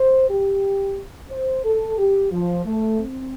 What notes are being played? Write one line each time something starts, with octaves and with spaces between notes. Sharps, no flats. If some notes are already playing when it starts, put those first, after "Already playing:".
Already playing: C5
G4
C5
A4
G4
F3
A3
C4